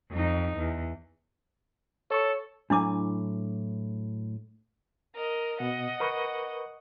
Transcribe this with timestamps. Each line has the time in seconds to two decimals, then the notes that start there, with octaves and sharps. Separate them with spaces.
0.11 F2 D#4
0.58 E2
2.11 A4 C#5 C#6
2.70 A2 F#3 D4 E4 G#5 D6
5.15 A#4 D#5
5.60 B2 D#5 F#5
6.00 A#4 B4 C#6